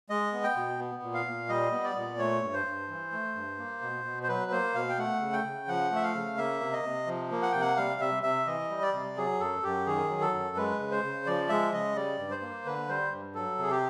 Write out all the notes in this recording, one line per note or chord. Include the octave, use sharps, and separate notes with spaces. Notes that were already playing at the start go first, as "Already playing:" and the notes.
G#3 D#5
B3
G5
B2
B3
A#2
F5
A#2
G3 D#5
B3
D5
A#2
A3 C#5
G2
C5
G2
E3
A3
G2
A#3
B2
B2
C5
F#3 B4
A#3 C5
B2 F5
G5
A3 F#5
C#3
G5
C#3
F3 F#5
A3
E5
F5
C#3
A#3 E5
C3
D#5
C3
F3
A#3
F#5
C3 G5
F#5
G3 F5
C3 E5
C3 E5
E3 D#5
G3
D5
C3
F#3 G#4
F#2 A4
F#2 G4
D#3 G#4
F#3
A4
F#2
G#3 B4
C#3
C5
C#3
F3 D5
G#3 E5
C#3 D#5
G3 D5
G2
C5
A#3
D3 B4
G3 C5
G2
F#3 A4
C3 G#4
G4